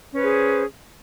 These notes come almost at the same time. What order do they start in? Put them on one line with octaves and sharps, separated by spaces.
C#4 B4 C5 G#4